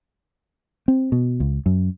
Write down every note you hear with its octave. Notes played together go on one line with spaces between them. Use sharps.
C4
B2
C#2
F#2